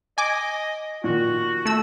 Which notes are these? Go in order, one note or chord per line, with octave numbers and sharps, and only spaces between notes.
D#5 G#5 D6
A#2 D#3 F#4
A3 E6